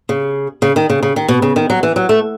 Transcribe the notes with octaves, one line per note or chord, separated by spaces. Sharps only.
C#3
C#3
D#3
C#3
C#3
D#3
B2
C#3
D#3
F#3
E3
F#3
A3